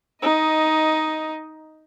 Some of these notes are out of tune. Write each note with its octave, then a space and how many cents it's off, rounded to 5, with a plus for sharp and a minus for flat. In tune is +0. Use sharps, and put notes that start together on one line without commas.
D#4 +10 D#5 +0